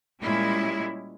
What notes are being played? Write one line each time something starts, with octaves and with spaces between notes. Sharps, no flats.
A#2 G3 G#3 C#4 E4